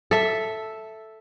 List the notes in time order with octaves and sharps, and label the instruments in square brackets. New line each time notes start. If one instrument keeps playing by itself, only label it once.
[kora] A4 E5